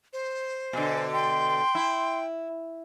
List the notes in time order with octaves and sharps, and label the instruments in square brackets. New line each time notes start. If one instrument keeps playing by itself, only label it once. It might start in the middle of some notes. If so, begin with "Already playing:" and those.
[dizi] C5
[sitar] B2 D3 [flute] G#5
[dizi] G5 [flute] C6
[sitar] E4